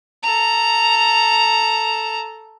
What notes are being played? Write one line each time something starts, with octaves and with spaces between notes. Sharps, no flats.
A4 A#5